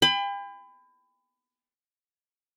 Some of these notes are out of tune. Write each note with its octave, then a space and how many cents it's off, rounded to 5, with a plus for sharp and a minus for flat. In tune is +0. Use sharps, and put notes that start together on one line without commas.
G5 +40 B5 +30